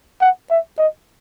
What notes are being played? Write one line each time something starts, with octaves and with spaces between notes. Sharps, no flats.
F#5
E5
D#5